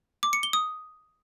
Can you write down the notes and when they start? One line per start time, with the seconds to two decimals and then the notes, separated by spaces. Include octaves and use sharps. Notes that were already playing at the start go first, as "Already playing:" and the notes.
0.23 D6
0.33 C#7
0.43 G7
0.53 D#6